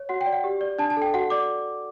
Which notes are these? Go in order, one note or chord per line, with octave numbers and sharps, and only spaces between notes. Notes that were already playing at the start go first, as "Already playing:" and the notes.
Already playing: C#5
F#4 F#5
G5
D5
F#5
G4
D5
D4 A5
A5
A4
G5
F#4 F#5
D5 D6